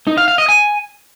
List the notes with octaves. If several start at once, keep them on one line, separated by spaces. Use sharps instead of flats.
D#4
F5
F5
D#5
G#5